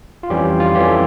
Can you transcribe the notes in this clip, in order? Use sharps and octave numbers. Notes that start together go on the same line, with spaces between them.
F4
F2 E3 G3 C#4 G4
F4
F4
F2 E3 G3 C#4 G4
A4